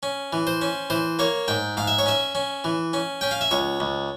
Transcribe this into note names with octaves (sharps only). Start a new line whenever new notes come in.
C#4
E3
C5
C#4
E3 C5
A#3 C#5
G#2 G5
G#2 F5
E5
C#5
C#4 E5
C#4
E3
C#4
C#4 G5
F5
E5
C#2 C#5
C#2